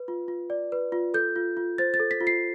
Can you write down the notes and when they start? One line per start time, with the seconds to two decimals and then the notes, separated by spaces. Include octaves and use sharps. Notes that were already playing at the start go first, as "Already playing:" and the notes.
Already playing: B4
0.08 F4
0.28 F4
0.50 D5
0.72 B4
0.92 F4
1.14 A4 G6
1.36 F4
1.57 F4
1.78 C5 A6
1.94 A6
2.00 A4
2.11 B6
2.21 F4
2.27 C7